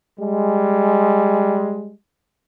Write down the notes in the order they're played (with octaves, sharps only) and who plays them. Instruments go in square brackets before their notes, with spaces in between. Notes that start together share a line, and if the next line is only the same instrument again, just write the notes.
[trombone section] G3 G#3